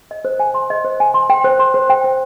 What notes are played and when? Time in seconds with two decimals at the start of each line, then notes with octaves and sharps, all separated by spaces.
0.11 D#5
0.25 C5
0.40 G#5
0.54 C6
0.70 D#5
0.84 C5
1.00 G#5
1.14 C6
1.30 G5
1.45 C5
1.59 C6
1.74 C5
1.90 G5
2.04 C5